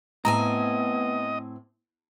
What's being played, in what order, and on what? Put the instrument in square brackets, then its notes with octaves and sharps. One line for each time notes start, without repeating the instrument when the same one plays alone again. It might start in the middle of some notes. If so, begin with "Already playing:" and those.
[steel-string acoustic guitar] A2 C4 G#5 [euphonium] B3 [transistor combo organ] D#5 [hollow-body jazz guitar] A#5